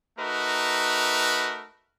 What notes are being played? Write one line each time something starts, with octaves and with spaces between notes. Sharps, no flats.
A3 D#4 F#4 A#4 B4